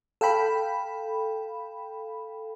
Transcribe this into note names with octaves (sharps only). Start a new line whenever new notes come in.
A4 F5 G5 B5